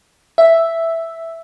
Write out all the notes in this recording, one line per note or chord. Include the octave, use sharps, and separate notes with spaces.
E5